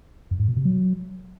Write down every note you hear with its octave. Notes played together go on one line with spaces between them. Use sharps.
F#2
G#2
B2
C3
F#3